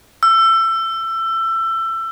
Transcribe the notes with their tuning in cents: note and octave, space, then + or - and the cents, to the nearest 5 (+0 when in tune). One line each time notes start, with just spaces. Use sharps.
E6 +25